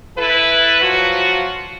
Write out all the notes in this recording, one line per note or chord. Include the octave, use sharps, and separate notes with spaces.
E4 A4 B4
F3 F#3 F4 F#4